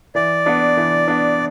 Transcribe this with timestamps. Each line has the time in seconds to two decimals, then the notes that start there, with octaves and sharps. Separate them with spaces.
0.15 E3 D5
0.46 B3 D4
0.77 E3
1.08 B3 D4